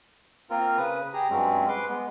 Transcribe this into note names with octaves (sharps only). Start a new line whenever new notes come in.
A#3 C4 F4 A#4
C#3 B4 D#6
G4 G#4 A#5
G2 F#3 G#3 C4 C#4
B4 C6 D6
G#3 B3